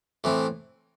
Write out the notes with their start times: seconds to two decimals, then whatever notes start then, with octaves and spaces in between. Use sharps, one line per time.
0.24 A2 E3 C4